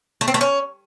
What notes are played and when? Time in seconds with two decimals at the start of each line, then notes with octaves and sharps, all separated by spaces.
0.21 A3
0.28 C4
0.34 A3
0.41 C#4